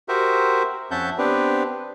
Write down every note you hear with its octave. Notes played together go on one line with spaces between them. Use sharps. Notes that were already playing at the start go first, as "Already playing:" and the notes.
F#4 G4 A#4 C5 E5
F2 C#4 E5 F#5 A5 G6
B3 C4 D4 G4 B4